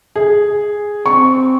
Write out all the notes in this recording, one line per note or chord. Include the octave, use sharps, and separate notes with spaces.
G#4
C4 C#6